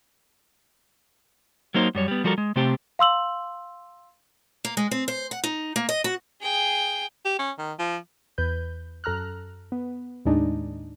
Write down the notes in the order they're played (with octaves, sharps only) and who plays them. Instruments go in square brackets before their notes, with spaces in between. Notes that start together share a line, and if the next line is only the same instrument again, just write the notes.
[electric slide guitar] F#3 A#3 D#4 C5
F#2 G3 C#5
G3 B3
F3 G3 F#4 A4 A#4
G#3
C3 A3 C4 G4 C5
[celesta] F5 C6 E6 F#7
[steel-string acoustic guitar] A#3
G#3
C4
C5
F#5
D#4
A#3
D#5
F#4
[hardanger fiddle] G#4 G5
[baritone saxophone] G4
C#4
D#3
F3
[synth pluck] E2 B4 G6
F#2 A4 A#5 F6 F#6
B3
D#2 A2 G#3 D4 D#4